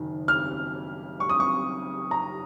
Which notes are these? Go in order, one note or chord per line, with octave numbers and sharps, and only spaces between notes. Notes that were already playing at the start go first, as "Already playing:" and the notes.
Already playing: F#1 F#2 D#3
F6
C#6
D#6
C#6
A#5